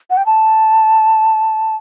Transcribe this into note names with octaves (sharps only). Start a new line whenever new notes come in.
F#5
G5
A5